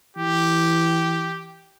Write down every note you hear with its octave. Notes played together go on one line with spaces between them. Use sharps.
E3 G4